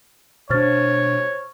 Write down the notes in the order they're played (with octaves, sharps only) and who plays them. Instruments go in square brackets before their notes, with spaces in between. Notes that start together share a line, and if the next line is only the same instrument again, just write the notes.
[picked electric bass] B2 D4 [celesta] C5 F6 A6 [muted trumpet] C#5